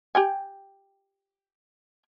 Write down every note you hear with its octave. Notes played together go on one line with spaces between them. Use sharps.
G4 G5 G#5